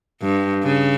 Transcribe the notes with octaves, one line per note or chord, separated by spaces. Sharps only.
G2
C#3